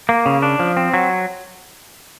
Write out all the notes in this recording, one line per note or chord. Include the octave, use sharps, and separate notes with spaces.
A#3
C#3
D4
F3
C4
F#3